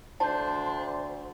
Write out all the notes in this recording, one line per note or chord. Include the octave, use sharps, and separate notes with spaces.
D2 D4 C5 A5